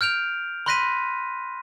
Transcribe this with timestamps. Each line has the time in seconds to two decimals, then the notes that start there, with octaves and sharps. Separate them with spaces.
0.01 F6 G6 D7 F7
0.66 B5 C6 F#6 A#6 B6 D#7